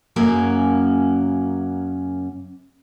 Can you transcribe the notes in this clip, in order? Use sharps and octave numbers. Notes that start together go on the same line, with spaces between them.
F#2 C#3 A#3 C#4 F#4